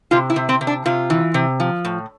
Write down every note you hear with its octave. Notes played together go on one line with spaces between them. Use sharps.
C3 F4
E4
C3
C4
C3
D4
C3 F4
E3
C3
F3
A2